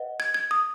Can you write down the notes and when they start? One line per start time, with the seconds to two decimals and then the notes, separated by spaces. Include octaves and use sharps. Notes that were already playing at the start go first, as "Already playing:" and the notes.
Already playing: B4 D#5 F#5
0.20 G#6
0.34 G#6
0.51 D#6